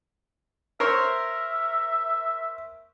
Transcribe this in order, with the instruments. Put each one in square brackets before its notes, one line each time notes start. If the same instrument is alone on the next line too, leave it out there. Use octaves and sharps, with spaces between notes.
[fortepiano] A#4 C5 C#5 [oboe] E5